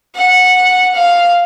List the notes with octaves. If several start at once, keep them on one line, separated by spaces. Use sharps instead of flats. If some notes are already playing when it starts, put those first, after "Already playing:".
F#5
F5